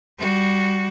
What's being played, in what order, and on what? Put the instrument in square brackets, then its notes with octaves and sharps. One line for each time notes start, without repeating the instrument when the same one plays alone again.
[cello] G3 F#4